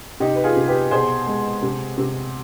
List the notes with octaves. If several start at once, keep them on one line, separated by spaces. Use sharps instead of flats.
C3 D#4 G4
B4
F4 G#4
C3
G4 B4
B2 G#4 C5
G#3
C3
C3